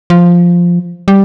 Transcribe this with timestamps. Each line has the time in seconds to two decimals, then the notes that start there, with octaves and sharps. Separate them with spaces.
0.10 F3
1.08 G3